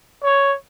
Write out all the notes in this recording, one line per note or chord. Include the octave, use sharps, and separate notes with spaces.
C#5